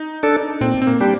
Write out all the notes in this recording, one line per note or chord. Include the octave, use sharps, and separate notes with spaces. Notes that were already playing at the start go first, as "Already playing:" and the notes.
Already playing: D#4
D4 A4
A#2 C4
C4
A#3
G3 D4 G4